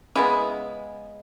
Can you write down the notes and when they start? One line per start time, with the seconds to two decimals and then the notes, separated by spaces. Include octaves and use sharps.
0.15 C#3 G#3 B3 E4